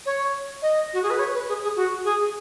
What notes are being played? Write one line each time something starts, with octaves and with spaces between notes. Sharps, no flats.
C#5
D#5
F#4
G#4
B4
C#5
B4
G#4
G#4
F#4
G#4